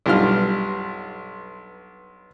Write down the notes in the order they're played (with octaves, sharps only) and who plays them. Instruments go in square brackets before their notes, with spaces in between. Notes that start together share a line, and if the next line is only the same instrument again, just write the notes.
[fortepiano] B1 G2 G3 F4 C6 F6